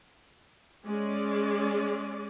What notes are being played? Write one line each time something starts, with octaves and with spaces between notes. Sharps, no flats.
G#3 C#4 D5